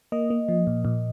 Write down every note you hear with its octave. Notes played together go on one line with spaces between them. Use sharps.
A#3 D#5
A#3
F3
A#2
A#2